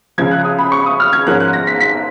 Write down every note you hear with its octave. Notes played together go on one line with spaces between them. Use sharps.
C#2 C#3 F3 G#6
F#6
D#6
B5
C#6
D#6
F6
G#6
G#2 F3 A#3 C#4 F#6
F#6
A#6
B6
B6